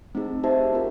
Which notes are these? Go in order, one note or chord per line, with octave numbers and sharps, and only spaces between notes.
A3 C4 D#4 G#4
D#4 G4 C5 E5 A5
C4 F4 A#4